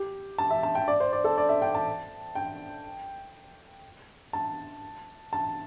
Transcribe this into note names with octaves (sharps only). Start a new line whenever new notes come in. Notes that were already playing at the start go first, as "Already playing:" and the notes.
Already playing: G4
A5
E5
A5
G5
D5
C5
D5
A4
D5
E5
G5
A5
G5
A5
A5